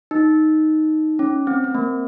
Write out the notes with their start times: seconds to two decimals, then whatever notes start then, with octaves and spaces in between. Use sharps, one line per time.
0.11 D#4
1.19 C#4
1.47 C4
1.64 C4
1.74 A#3